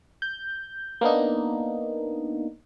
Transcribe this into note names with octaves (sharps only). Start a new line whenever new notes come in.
G6
A#3 B3 D4 D#4